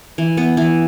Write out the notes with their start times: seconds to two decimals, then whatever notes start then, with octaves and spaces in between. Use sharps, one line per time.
0.18 E3
0.37 B3
0.57 E3